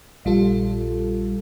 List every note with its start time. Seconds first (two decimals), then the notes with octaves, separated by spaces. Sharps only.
0.25 A#1 G3 F4 A4